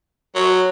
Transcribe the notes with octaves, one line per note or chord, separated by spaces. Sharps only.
F#3